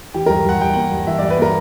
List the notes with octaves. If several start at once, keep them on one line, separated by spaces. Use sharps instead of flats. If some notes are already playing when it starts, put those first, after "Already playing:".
E3 G4
G2 A#4
G2 F#5
G2 G5
A#3 F#5
G2
E3 E5
G2 D5
B4
A#3 A#4